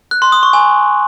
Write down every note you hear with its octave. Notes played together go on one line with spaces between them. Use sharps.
F#6
C6
D#6
C#6
G#5